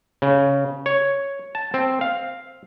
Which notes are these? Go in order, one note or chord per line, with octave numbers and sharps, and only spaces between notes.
C#3
C#5
A5
C4
F5